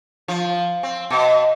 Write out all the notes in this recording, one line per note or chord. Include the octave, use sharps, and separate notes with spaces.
F3
C4
B2